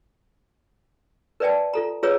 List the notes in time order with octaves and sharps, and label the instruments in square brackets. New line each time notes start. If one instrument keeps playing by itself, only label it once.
[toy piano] A#4 B4 D5 E5 G5 A5
F4 A4 A#5
F4 G#4 B4 C#5 A#5 E6